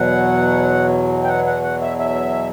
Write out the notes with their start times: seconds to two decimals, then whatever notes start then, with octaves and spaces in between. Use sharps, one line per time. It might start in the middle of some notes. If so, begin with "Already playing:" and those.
Already playing: E2 B2 F#3 F#5
1.24 G5
1.28 F#5
1.47 F#5
1.63 F#5
1.81 E5
1.99 E5